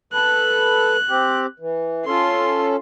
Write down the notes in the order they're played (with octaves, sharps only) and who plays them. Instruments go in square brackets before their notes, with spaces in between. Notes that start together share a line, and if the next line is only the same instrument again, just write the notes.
[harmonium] A4 B4 [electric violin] F#6
[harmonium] C4 G4
E3
[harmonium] C#4 A4 [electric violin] F4 C6